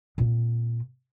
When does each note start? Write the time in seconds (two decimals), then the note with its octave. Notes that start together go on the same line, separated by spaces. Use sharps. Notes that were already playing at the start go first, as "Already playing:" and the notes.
0.18 A#2 C4